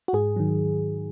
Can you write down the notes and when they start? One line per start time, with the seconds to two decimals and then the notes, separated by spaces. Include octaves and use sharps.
0.08 F#4
0.13 G#2 G#4
0.36 D#3 F#3